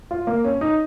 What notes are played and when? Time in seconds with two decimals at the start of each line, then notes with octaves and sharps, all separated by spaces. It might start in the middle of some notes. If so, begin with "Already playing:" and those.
0.11 F4
0.27 A#3
0.44 C#4
0.61 D#4